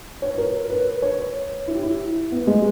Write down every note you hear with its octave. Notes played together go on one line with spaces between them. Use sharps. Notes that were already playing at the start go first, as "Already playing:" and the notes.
C#5
A#4
B4
C#5
E4
G4
E4
B3
G#3